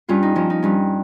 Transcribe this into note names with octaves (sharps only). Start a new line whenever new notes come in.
G2 C#4 F4
D#4
F3 C#4
D#4
G2 C#4